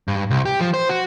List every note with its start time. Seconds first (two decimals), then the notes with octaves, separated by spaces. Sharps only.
0.08 G2
0.30 C2
0.45 G4
0.61 F3
0.74 C5
0.89 F#4